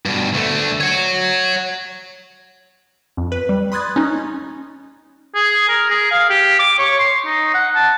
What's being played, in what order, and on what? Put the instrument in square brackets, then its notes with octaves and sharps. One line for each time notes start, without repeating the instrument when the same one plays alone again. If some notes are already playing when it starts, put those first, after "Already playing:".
[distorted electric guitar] G2 B2
D2 A3
C#5 F#5
[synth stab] F2
B4
G3
B5 C6 D#6 F#6 G#6 A6
C#4 D#4
[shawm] G#4
A#4
G#4
F5
G4
D6
C#5
C6
D#4
F#5
A5